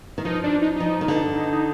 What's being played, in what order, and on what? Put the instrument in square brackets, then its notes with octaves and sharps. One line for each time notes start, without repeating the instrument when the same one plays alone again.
[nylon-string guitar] D#3
[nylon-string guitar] F3 [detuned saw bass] D#4
[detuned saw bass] D4
D#4
[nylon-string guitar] F3 [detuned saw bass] D#4
[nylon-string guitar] D#3
D3
[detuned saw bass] D#4
D#4